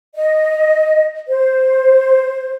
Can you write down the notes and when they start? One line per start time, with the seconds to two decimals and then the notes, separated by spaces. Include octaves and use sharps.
0.16 D#5
1.28 C5